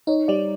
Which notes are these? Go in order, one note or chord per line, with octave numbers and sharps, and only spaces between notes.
D#4 C#5
G3 D5